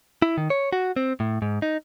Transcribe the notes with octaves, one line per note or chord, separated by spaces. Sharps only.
E4
D#3
C#5
F#4
C4
A2
G#2
D#4